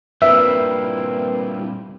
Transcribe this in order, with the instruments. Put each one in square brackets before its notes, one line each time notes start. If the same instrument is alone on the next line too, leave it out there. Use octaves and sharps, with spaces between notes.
[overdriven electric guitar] G2 A#2 [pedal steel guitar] G3 C4 E4 [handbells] A#4 B4 [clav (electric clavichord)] E5